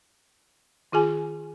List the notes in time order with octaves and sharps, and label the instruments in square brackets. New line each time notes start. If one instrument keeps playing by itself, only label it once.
[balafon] D#3 F4 G#4 G#5